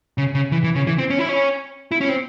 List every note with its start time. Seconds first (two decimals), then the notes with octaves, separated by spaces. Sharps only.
0.18 C#3
0.35 C#3
0.52 E3
0.64 E3
0.75 C#3
0.87 E3
0.98 C4
1.10 C#4
1.19 E4
1.29 C#4
1.92 E4
2.01 C#4
2.09 C4